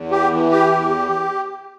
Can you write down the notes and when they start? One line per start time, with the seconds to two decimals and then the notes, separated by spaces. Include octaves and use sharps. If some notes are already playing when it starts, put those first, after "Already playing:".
Already playing: E2
0.11 G4
0.31 E3
0.51 G4
0.71 E2